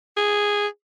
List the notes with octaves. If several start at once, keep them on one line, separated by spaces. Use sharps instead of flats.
G#4